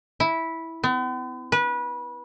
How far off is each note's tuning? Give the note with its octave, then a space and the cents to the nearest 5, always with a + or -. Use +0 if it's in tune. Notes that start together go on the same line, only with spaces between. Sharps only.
E4 -10
B3 +45
B4 -25